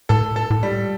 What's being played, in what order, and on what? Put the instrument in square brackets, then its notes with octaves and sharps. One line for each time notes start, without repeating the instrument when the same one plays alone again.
[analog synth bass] A2 [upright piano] A4
[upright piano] A4
[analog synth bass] A2
[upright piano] G3